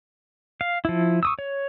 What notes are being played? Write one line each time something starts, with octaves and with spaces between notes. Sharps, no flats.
F5
F3 E4
C#6 D#6 E6
C#5